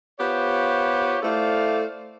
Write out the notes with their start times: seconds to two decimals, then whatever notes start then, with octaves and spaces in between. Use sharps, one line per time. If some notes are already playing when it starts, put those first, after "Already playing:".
0.20 B3 F4 G4 C5 C#5
1.23 A3 E4 A4 C5 D5 F5